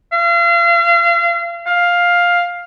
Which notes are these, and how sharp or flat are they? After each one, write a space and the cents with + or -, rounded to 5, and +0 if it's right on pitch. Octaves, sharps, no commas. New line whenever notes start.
F5 -35
F5 +10